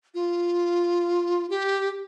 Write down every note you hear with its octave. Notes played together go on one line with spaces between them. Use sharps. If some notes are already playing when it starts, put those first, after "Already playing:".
F4
G4